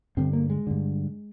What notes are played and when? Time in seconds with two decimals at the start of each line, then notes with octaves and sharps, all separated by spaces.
0.17 G2 D3 C4
0.33 A#3
0.50 G#3
0.67 G2 D3